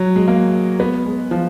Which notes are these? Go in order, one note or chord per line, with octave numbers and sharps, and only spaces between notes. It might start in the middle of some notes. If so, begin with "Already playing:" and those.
Already playing: F#3
G#3
A#3
B3
G#3
F3